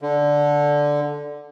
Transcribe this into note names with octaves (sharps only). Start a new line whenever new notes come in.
D3